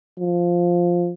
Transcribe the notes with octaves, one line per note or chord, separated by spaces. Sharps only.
F3